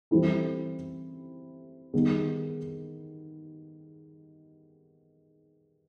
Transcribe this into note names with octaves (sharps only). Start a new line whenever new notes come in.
E3 G3 C4 E4 A4
D#3 G3 B3 D#4 G#4